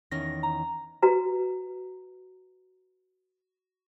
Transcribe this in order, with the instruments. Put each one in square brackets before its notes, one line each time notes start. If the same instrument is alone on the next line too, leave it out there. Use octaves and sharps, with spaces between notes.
[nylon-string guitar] E2 D#3 C#4 [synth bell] A#6
[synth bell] A#5
[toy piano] F#4 B4 A#5